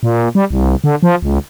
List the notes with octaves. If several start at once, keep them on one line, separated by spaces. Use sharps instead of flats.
A#2
G3
C2
D3
F3
C#2